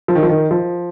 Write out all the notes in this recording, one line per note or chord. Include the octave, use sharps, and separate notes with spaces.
F3
D#3
F3
D#3
F3